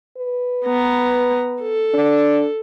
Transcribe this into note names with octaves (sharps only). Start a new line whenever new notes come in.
B4
B3 A#5
A4
D4